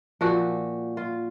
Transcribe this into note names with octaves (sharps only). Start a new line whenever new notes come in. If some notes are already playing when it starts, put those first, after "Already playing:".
A#2 F3 F#4
F4